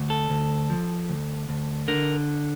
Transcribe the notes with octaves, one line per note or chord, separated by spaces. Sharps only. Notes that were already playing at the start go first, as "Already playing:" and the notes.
Already playing: D2
A4
D2
F3
D2
D2
D3 A#4